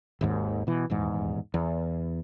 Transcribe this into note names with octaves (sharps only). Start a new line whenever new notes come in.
G#1 D#2 G#2
B2 E3
D#1 E2 G#2
E2